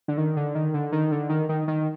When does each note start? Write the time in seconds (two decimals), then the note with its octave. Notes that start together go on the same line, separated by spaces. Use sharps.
0.08 D3
0.18 D#3
0.37 D3
0.55 D#3
0.74 D3
0.92 D#3
1.12 D3
1.30 D#3
1.49 D#3
1.68 D#3